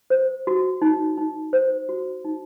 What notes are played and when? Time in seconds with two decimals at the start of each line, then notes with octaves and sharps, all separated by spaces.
0.10 C5
0.47 F#4
0.82 D#4
1.18 D#4
1.53 C5
1.89 F#4
2.25 D#4